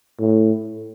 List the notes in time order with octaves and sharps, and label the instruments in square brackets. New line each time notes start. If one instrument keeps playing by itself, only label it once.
[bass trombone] A2